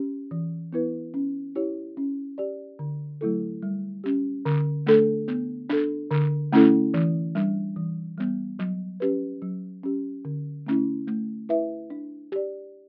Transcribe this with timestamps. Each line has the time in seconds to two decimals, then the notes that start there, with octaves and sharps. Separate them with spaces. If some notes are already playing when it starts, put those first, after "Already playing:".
Already playing: C#4 G4
0.31 E3
0.73 B3 E4 B4
1.14 C#4
1.55 E4 G4 C#5
1.97 C#4
2.38 G4 D5
2.79 D3
3.21 F#3 A3 E4 A4
3.63 G3
4.04 C#4 G4
4.46 D3
4.87 A3 D4 A4
5.28 B3
5.70 D4 A4
6.11 D3
6.52 A3 C#4 E4 A4
6.94 E3
7.35 G3 D4
7.76 E3
8.18 G3 B3
8.59 F#3
9.00 C#4 G4 B4
9.42 F#3
9.83 C#4 G4
10.25 D3
10.67 A3 C#4 E4
11.07 A3
11.49 E4 B4 E5
11.90 D4
12.32 G4 D5